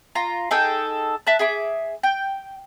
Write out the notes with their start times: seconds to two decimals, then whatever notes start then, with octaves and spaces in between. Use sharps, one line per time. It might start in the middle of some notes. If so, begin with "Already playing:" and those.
0.15 F4 A#5
0.51 D#4 G#4 A4 G5
1.27 E5 A5 F#6
1.39 G#4 E5 D6
2.03 G5